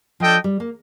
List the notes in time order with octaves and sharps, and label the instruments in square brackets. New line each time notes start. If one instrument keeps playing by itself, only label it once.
[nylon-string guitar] F3 [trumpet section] D4 A4 D#5 G5
[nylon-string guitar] G3
A#3